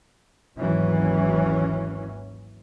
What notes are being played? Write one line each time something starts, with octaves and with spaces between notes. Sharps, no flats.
G#1 D#2 E3 F#3 C#4